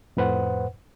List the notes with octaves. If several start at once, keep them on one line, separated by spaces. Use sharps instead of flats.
F2 A2 B4 C5 F#5